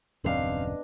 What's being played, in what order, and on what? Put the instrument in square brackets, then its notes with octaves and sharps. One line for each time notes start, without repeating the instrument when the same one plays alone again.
[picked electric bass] D#1 F#2 C#3 [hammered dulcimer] B3 D4 D#5 [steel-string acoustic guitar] C4 F5